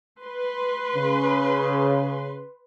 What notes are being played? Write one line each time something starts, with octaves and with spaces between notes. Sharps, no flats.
B4 C6
C#3